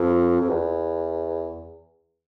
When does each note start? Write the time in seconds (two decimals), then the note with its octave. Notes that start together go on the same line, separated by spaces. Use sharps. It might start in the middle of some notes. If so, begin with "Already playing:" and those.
Already playing: F2
0.41 F2
0.49 E2